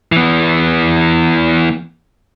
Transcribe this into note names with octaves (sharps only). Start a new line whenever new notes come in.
E3 B3